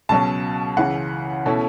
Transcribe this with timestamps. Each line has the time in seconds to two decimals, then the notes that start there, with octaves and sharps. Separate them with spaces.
0.09 C#2 B2 F#3 C#4 A5
0.77 C#2 C#3 E3 F#5
1.46 B2 A3 C#4 E4 A4